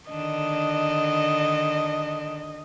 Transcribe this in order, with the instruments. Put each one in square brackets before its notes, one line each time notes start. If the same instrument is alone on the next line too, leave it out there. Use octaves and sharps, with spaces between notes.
[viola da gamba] D3 D#3 D4 [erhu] D#5